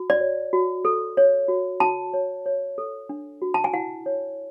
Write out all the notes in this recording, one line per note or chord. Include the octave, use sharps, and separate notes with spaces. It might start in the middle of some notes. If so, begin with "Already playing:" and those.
Already playing: F#4
D5
C#5
F#4
A4
C#5
F#4
F#4 A5
C#5
C#5
A4
D4
F#4
A5
G#5
E4 F#5
C#5